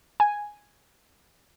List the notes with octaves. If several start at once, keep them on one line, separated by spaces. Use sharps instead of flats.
G#5